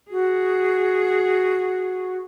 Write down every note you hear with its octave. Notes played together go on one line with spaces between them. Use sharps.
F#4 G#4